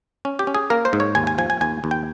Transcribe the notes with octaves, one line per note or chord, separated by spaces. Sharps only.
C#4
G4
C#4
G#4
A#3 A#4
C5
G#2
C#5
D#2 G#5
G#5
F3 G#5
G#5
D#2 G#5
D#2
G5